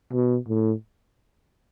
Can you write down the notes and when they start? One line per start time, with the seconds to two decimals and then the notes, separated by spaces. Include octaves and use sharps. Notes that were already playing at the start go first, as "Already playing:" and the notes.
0.13 B2
0.48 A2